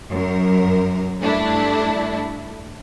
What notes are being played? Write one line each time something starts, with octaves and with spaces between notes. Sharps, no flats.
F#2 A#4
G2 A3 D4 E4